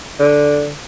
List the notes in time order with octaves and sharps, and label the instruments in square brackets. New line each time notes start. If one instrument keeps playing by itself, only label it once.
[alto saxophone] D3